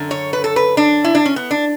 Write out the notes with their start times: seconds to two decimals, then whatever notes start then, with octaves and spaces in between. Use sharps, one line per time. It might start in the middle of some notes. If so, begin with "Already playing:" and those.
Already playing: F#2 D3
0.11 C#5
0.33 B4
0.44 A4
0.56 B4
0.77 D4
1.04 E4
1.15 D4
1.26 C#4
1.36 B3
1.51 D4